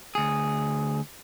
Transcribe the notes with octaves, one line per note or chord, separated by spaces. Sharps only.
D2 G#4